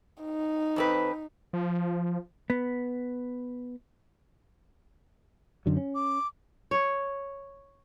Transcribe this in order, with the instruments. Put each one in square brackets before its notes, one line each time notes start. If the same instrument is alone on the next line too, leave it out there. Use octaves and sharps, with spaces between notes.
[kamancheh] D#4
[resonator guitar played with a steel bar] F2 C4 B4
[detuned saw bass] F3
[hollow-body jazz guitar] B3
[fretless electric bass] F#2 D3 F#3
C#4
[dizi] D6
[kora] C#5